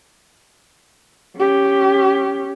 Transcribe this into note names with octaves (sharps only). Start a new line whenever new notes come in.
C#4 G4